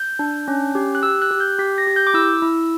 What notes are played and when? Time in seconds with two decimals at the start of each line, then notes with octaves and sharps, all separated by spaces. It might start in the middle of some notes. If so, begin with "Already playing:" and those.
Already playing: G6
0.19 D4
0.48 C#4
0.75 G4
0.95 F#6
1.03 G4 E6
1.22 F#6
1.31 G4
1.40 G6
1.59 G4 B6
1.78 A#6
1.87 G4
1.96 G6
2.07 D6
2.14 E4 E6
2.42 E4